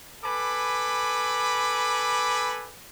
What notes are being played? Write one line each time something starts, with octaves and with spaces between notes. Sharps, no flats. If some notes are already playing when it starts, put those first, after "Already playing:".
A4 B4 G#5 B5 D6